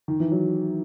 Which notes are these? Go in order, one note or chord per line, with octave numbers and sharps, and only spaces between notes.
D#3
E3
F#3